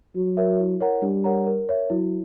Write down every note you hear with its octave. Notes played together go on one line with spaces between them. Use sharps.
F#3 F#4
A#4 C#5 E5
E4
A#4 C#5 F#5 A#5
G3 D4
A#4 C#5 F#5 A#5
A#4
C#5 E5
F#3 E4